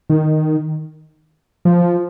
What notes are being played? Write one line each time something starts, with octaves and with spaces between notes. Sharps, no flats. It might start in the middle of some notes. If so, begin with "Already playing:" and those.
D#3
F3